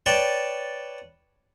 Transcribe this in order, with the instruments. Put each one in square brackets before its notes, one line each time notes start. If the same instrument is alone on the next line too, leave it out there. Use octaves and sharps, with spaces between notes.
[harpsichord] B4 C#5 D5 G5 A5